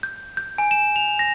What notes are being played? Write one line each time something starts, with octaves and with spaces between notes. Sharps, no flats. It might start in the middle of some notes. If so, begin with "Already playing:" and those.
G6
G6
G#5
E7
F7
A#6